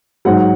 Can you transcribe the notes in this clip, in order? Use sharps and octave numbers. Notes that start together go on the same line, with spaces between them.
G#2 F#3 F#5